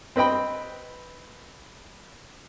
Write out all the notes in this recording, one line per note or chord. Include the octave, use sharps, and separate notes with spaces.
C4 B4 D#5 G5 B5